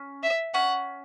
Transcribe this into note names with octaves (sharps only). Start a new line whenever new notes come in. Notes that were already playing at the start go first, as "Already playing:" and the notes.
Already playing: C#4
E5
C#4 F#5